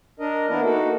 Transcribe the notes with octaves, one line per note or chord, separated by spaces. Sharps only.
D4 A#4 D#5
E3 A#3 B3 D4 E4 A#4
A#3 D#4 F#4 A4